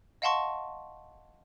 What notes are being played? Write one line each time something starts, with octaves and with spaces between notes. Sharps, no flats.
D#5 F5 F#5 A5 C6 C#6